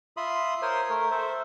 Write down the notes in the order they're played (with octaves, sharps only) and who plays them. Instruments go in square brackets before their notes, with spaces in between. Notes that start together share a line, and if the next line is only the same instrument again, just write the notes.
[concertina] F4 E5 B5 C6 D#6
A#4 C5 C#5 C6 D#6
A3 A#4
A4 C5 E5